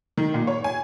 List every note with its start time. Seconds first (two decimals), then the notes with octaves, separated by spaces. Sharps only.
0.17 D#3
0.34 A#2
0.47 C#5
0.64 G#5